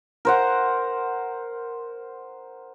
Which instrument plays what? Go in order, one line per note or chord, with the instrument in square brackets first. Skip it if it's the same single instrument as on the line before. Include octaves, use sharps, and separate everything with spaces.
[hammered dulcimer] A#4 C5 F#5